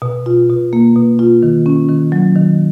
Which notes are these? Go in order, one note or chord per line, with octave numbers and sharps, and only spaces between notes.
B2
F4
B2
A#3
B2
F4
D#3
C#4
D#3
F#3
D#3